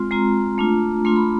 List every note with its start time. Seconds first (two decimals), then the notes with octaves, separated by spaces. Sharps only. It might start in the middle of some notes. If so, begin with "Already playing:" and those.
Already playing: G#3 C4 F4 C6
0.11 G#3 C4 F4 A#5
0.58 A3 D4 F4
1.05 A3 D4 F4 C6
1.16 B5